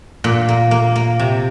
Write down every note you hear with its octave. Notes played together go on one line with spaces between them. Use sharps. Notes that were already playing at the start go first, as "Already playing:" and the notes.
A#2
A#3
A#3
A#3
C3